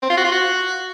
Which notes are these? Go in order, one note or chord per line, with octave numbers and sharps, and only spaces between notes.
C4
F4
F#4
F4
F#4